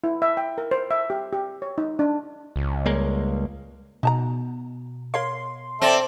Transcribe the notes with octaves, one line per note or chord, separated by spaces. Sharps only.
E4
E5
G5
A#4
C5
E5
G4
G4
C#5
D#4
D4
C#2
G3 G#3 A#3
B2 D#4 A5 A#5
A#4 C#5 F5 C6
C4 A4 D5 E5